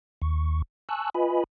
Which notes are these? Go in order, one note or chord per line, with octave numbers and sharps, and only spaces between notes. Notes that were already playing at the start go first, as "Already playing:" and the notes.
D#2 C#6
G#5 A5 C#6 E6 F#6
F4 B4 D#5 G#5 B5